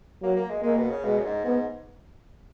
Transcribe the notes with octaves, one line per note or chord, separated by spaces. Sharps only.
F#3 A#3
A#3
G#3
G#3 A#3
B2
C#3
B2 G#3
F#2
G#2
G#2 B3